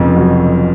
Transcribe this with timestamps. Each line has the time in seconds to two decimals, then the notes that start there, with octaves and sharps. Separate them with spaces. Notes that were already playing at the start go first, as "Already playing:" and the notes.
Already playing: F1 F2 C#3
0.16 F#3